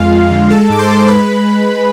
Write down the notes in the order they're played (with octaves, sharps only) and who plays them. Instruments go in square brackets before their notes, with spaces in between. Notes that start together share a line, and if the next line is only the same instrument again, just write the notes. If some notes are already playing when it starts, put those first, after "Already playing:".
Already playing: [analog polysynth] F2 G#3 F4 F5
G#3
D3
G#3 A4 A5
G#2 D6
C5 C6
G#3
B4 B5